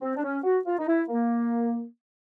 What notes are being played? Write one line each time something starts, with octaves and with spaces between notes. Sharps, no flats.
C4
D4
C#4
F#4
F4
D#4
E4
A#3